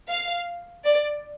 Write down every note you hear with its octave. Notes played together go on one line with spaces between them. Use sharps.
F5
D5